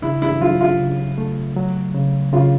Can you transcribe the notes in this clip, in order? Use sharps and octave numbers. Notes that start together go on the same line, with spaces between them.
C#3 E4
E4
F#3 F4
F4
C#3
A3
F#3
C#3
C#3 F4